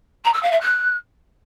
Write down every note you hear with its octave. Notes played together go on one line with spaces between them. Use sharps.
A#5
E6
F5
E5
F#6